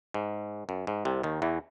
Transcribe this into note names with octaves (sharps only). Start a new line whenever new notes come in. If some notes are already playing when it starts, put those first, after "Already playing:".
G#2
F#2
G#2
C2 C3
D#2 D#3
E2 E3